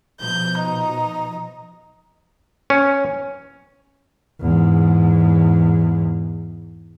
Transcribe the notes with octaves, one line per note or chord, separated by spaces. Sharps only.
B2 F3 G6
D#4
C#4
E2 G#2